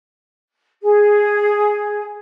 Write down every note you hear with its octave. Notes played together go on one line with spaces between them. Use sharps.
G#4